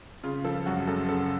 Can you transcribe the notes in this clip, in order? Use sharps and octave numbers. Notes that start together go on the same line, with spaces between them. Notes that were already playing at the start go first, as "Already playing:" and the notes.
C#3 F4
F3 A4
F#2 F#4
F#2 A4
C#3 A4